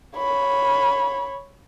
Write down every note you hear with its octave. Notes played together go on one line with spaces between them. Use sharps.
C#5 B5